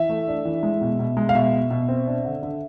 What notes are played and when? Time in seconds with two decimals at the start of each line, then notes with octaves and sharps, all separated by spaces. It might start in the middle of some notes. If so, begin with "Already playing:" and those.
Already playing: E3 E5
0.09 A3
0.28 D4
0.45 E3
0.63 G#3
0.81 B2
0.99 B2
1.17 G#3
1.29 F5
1.35 B2 E5
1.54 B2
1.71 B2
1.89 C4
2.07 D4
2.25 D3
2.43 D3